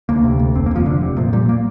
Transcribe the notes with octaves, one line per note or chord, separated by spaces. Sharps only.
D2 A#3
C3
D2
F1 C4
A#3
F1 F3
F1 D3
C3
A#2 F3
A#2 G3
A#3